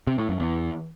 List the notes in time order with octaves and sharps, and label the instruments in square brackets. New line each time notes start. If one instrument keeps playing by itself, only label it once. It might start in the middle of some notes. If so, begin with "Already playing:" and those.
[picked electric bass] C3
A2
F#2
E2